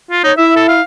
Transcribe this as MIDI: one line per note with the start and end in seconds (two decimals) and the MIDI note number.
0.11 0.23 65
0.24 0.32 63
0.24 0.34 73
0.37 0.80 64
0.37 0.53 76
0.56 0.68 69
0.68 0.82 77